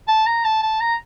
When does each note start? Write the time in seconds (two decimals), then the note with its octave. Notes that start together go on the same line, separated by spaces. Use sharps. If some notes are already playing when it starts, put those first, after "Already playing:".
0.08 A5
0.26 A#5
0.44 A5
0.63 A5
0.80 A#5